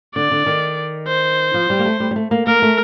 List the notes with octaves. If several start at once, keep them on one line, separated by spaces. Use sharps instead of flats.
D3 D5
D3
D#3
C5
F3
G3
A#3
A3
G3
G3
A3
A#3
A#3 A#4
A3